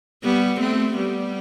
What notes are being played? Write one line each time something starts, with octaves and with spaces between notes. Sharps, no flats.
G3 B3
A3 C4
G3 B3